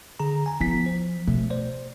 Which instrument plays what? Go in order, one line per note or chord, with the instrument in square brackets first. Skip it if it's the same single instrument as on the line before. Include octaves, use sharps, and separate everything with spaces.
[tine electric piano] D3 G#4 A#5
G#5 A#5
[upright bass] F3 [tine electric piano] B3 E4 B6
[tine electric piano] C5
[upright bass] B2 [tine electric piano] A3
[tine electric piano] C5 D5